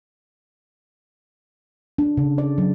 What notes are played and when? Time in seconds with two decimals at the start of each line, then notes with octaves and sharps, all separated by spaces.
1.98 D4
2.17 C#3
2.38 D5
2.58 F#3